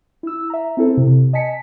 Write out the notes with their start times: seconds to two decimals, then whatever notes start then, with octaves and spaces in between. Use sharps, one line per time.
0.23 E4 E6
0.50 E5 A#5
0.77 C4 E4 A4 C5
0.97 C3
1.33 D#5 G#5 A5 B6 C#7